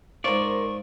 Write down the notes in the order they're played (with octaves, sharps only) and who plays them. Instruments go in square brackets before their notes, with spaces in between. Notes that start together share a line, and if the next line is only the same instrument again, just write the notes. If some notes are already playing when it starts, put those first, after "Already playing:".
[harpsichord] G#2 F4 [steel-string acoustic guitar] A#4 C5 [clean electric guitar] D5 [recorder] C#6